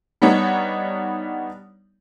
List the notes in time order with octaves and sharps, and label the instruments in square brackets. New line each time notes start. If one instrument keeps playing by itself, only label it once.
[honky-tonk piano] G3 B3 D4 D#4 C#5